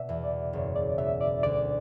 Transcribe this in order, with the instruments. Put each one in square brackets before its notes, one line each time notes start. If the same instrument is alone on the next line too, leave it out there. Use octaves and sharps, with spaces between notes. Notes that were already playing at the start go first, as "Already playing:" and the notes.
Already playing: [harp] B2 [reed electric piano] D5 E5
[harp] E2
[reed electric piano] D5
[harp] F#1 [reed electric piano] C#5
[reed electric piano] D5
[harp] B2 [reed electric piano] E5
[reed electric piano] D5
[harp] D2 [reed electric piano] D5